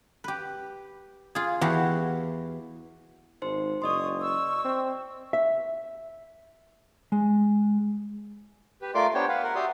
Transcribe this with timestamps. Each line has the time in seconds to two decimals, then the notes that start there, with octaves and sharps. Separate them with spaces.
0.24 G4 B4
1.35 F4 G#4
1.61 E2 E3 F#4 G4 F5
3.42 G#1 D#4 C5 C6
3.82 F#1 D5 D#5 C6 C#6 D#6
4.20 C#6 E6
4.64 C4
5.33 E5
7.12 G#3
8.81 G4 B4
8.95 A3 F4 A#4 D5 C6 D6
9.14 B3 D4 G4 C5 C#5 G5
9.28 B4 F5 F#5
9.43 A#4 F#5
9.55 F#4 G4 D5 E5 C6 D#6